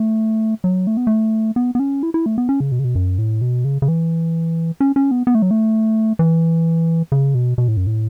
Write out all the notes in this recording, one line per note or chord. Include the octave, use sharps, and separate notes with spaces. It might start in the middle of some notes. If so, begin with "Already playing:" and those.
Already playing: A3
F#3
A3
B3
A3
B3
B3
C#4
E4
E4
A3
B3
C#4
C#3
B2
C#3
B2
F#2
A2
B2
C#3
C#3
E3
C#4
C#4
B3
B3
A3
F#3
A3
E3
C#3
B2
B2
A2
F#2
A2